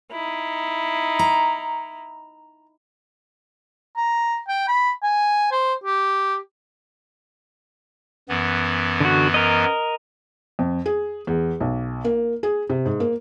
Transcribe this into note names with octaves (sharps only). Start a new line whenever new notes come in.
D#4 E4
A#5
A#5
G5
B5
G#5
C5
G4
F#2 E3 B3
D3 F#4
A#4 D#5
F2
G#4
E2
B1
A#3
G#4
C3
G#2
A#3